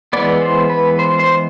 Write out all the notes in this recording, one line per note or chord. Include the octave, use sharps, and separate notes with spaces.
E3 G#3 B3 D5
C5
B4
C5
C5